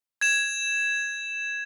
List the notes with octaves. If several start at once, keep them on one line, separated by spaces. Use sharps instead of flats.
G#6 E7